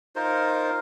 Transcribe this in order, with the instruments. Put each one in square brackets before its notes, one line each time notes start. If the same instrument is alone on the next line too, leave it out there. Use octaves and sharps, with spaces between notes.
[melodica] D#4 F4 A#4 C5